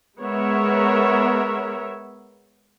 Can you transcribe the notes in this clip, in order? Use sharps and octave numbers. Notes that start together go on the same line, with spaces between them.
G#3 B3 A#4 C#5 E5